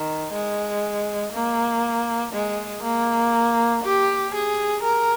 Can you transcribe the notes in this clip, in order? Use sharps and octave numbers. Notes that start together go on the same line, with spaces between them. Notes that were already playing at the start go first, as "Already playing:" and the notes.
Already playing: D#3
G#3
A#3
G#3
A#3
G4
G#4
A#4